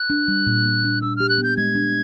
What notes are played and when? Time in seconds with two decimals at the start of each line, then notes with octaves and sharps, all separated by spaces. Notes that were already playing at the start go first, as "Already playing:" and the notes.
Already playing: F#6
0.10 D4
0.28 G3
0.47 A#2
0.65 A#3
0.84 D4
1.02 D4 E6
1.16 G4 F6
1.29 F#6
1.38 B3
1.43 G6
1.57 G#3 G#6
1.75 D4